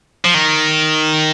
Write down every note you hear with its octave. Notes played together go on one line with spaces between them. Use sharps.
F3
D#3